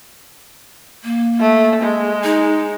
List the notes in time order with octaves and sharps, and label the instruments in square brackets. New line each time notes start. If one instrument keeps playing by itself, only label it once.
[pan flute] A#3
[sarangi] A3
G#3
[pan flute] D#4